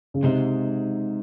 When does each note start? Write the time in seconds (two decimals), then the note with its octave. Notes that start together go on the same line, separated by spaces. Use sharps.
0.14 C#3
0.23 C3 G#3 D#4 G#4 C5 D#5